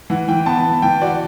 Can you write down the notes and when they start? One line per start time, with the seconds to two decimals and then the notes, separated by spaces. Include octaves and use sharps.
0.10 E3 F#5
0.28 E3 G5
0.46 B3 A5
0.65 B3
0.82 E3 G5
1.01 F#4 D5